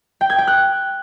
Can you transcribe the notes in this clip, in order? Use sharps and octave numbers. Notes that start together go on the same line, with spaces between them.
G5
G#6
G5
F#6